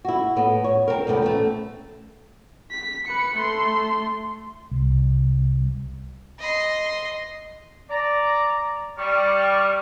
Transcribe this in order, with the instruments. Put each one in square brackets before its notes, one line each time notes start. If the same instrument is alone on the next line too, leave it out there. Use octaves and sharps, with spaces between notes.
[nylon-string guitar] E4 F#4
A2 B3
C#5
C4 A#4
E2 C3 A3 B3
A3 C4 C#4
[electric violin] B6
B4 C#7
A3 C6
[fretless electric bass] C2
[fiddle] D#5 C6
[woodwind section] D5 A#5
G3 D5 C#6 F6